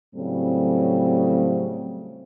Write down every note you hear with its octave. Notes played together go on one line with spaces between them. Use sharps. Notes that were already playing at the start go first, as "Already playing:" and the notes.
A2 C#3 F#3 G3 A3 C4